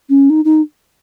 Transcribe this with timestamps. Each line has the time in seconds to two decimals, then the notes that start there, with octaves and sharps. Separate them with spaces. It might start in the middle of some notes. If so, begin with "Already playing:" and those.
0.09 C#4
0.30 D#4
0.45 D#4